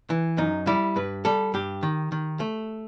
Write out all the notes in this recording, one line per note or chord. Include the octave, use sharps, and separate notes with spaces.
E3
F#2 D#4
G3 E4
G2 B4
G3 A4
G2 G4
D#3
D#3
A3